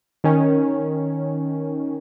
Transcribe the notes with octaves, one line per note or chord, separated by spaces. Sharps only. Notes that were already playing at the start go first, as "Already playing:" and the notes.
D#3 C#4